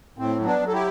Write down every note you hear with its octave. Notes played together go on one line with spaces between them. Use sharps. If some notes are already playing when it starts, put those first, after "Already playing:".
A2 C4
F#3
B3 D4
F#3
A4
E4 G4